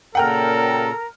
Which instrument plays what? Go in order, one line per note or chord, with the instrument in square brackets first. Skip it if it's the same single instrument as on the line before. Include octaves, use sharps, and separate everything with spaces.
[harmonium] A#2 C#3 [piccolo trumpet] A4 [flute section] A#4 A#5 [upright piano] F#5 G5 F6